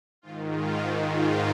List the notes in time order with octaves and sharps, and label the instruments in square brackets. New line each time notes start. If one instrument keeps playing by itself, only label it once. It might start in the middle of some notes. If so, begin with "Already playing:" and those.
[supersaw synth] G#2 D#3 F4
F4
G#2 D#3
F4